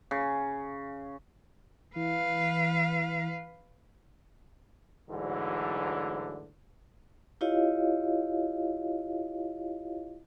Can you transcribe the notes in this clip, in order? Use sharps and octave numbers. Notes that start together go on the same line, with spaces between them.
C#3
E3 B4 F5
D2 G#2 D3 E3 F#3
E4 F4 G4 C#5 D#5 F5